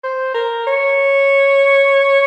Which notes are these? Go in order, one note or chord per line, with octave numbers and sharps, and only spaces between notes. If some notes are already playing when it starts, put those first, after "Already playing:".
C5
A#4
C#5